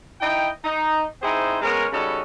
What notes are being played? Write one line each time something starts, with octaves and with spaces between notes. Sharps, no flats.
D#4 E4 D#5 G5
D#4
C4 D#4 E4 G#4 C5
G#3 B3 C#4 A#4
C#3 G3 C#4 D#4 F#4 A4